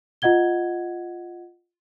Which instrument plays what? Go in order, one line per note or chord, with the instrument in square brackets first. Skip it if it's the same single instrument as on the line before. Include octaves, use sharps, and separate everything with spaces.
[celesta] F4 D#5 F#5 G#6 G7